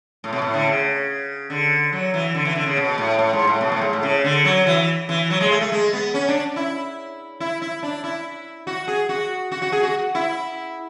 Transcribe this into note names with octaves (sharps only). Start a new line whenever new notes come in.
A2
B2
A2
D3
C#3
D3
F#3
E3
D3
E3
D3
C#3
B2
A2
A2
G#2
A2
B2
A2
G#2
A2
C#3
D3
F#3
E3
E3
F#3
G#3
A3
A3
G#3
B3
C#4
D4
E4
E4
E4
D4
E4
F#4
G#4
F#4
F#4
F#4
G#4
F#4
E4